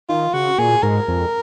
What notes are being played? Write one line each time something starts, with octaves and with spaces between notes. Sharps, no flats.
D#3 F4
C#3 F#4
A#2 G#4
G#2 A#4
F2